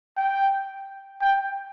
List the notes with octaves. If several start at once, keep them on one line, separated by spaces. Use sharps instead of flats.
G5
G5